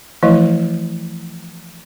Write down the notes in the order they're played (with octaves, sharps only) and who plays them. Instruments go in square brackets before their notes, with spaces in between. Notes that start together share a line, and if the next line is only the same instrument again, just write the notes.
[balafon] E3 F3 A3 E4 D#5